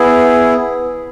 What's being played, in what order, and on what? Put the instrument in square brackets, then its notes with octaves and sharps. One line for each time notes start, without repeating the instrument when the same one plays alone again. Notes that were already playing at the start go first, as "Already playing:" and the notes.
Already playing: [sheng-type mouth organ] B3 E4 G#4